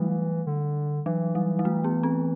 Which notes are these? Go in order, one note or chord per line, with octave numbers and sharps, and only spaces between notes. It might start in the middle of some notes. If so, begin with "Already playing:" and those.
Already playing: E3 F#3 G3 A3
D3
E3 F#3
G3
G3
A3
B3
C4